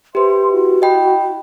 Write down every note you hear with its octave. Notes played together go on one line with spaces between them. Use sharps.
G4 B4 C5 E5 C6
E4 F#4
D#5 G5 B5